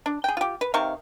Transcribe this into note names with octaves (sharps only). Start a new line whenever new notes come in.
D4
G#4 G5
F4 G4
B4
C3 D#3 F5 C#6